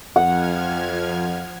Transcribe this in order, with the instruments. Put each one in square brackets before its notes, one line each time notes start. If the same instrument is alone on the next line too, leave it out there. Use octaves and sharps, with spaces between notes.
[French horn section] F2 [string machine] F3 F6 G#6 [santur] F#5